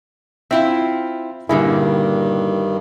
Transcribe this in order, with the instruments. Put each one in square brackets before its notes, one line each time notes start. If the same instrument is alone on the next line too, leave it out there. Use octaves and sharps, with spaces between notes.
[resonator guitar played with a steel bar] C4 E4 F4 [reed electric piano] E5 G5
[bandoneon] G2 D#3 [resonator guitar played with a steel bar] A#2 D3 A#3 [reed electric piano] E4 G#4